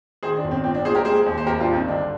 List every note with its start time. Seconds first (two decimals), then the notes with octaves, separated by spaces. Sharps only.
0.23 D#3 G#4 C5
0.37 D4
0.44 G1
0.51 C4
0.64 A#2 C4
0.74 D4
0.85 A#2 G#4 C5
0.95 G4 A#4
1.05 G#3 G#4 C5
1.26 D#2
1.38 C5
1.47 G#1 G4 A#4
1.60 D4 F4
1.67 G2
1.73 C4 D#4
1.88 D3 D4